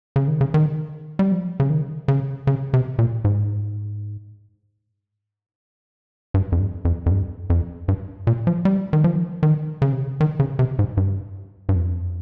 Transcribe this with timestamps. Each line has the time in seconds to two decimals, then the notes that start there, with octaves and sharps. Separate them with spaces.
0.16 C#3
0.27 D#3
0.41 C#3
0.54 D#3
1.19 G3
1.32 F3
1.60 C#3
1.70 D#3
2.08 C#3
2.47 C#3
2.74 C3
2.99 A#2
3.25 G#2
6.34 G2
6.52 F2
6.59 G2
6.85 F2
7.06 F2
7.11 G2
7.50 F2
7.88 G2
8.27 A#2
8.47 F3
8.65 G3
8.93 D#3
9.04 F3
9.43 D#3
9.82 C#3
9.92 C3
10.02 C#3
10.21 D#3
10.40 C#3
10.59 C3
10.79 G#2
10.97 G2
11.69 G2
11.75 F2